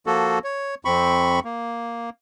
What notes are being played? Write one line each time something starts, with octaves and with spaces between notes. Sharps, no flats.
F3 A#3 F#4 A4
C#5
F2 C4 B5 C#6
A#3